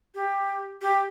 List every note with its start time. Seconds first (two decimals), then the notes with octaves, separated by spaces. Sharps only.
0.15 G4
0.82 G4